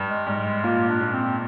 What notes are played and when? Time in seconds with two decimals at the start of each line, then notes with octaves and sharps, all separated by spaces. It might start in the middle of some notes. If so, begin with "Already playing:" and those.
Already playing: G2
0.08 G#3
0.27 G#2 G3
0.37 G3
0.45 G#3
0.64 A#2 A#3
0.89 D4
1.01 A#2
1.14 C4